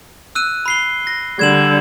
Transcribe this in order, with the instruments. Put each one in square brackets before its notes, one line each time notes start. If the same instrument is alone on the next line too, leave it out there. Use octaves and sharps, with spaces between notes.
[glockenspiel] E6 F#6 D#7
B5 C7 G7
A#6
[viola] D3 G3 [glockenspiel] G#6 E7 F#7